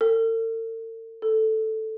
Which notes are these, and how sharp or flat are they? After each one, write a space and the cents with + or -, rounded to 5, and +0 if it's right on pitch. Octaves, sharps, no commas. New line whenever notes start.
A4 +45
A4 +0